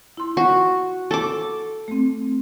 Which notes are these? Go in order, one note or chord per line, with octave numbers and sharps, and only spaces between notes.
E4 C6
F#4
A4 D6
A3 C4